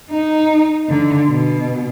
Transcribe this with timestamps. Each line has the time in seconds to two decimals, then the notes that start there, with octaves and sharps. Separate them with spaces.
0.11 D#4
0.89 D3
1.30 B2